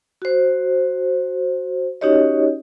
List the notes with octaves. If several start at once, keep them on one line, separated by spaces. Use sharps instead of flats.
F#4 C5
C#4 D#4 F#4 G4 C#5 D#5